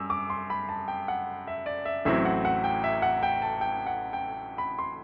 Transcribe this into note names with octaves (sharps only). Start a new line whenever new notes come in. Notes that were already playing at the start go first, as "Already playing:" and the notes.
Already playing: F#2 G3 E6
D6
C6
B5
A5
G5
F#5
E5
D5
E5
A1 A2 F#3 C4 E4 E5
F#5
F#5
G5
E5
F#5
G5
A5
G5
F#5
G5
B5
C6